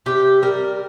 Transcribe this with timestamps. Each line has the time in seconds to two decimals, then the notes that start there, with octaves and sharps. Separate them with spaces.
0.06 C3 G4
0.42 G3 A#4